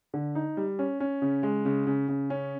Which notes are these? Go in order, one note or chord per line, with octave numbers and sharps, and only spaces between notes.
D3
D#4
G3
C#4
C#4
C#3
G#3
C#3
C#3
C#3
C#4